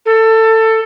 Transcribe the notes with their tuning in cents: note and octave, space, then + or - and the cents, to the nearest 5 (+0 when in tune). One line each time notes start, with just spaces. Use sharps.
A4 +20